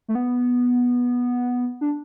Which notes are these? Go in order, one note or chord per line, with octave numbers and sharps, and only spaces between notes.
A3
B3
D4